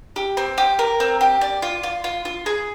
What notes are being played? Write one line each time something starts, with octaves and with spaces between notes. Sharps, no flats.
G4
C4
G4
A#4
C4
G4
D5
F4
F4
F4
F4
G#4